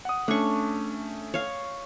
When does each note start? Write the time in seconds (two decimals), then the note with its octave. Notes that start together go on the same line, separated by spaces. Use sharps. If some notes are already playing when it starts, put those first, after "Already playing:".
0.05 F#5 D#6
0.28 A3 C#4 D4 C#6
1.34 C#5 F5